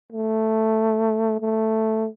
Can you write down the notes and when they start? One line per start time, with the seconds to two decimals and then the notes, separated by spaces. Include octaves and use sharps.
0.12 A3
1.41 A3